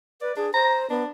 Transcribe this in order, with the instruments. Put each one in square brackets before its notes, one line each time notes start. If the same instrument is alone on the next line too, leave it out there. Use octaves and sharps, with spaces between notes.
[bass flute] B4 [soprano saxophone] D5
[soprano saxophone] D4 [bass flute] G#4
[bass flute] C5 [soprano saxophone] A#5
[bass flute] B3 [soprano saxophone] D4